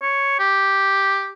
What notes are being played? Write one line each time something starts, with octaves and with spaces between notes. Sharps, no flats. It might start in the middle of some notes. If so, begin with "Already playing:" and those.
C#5
G4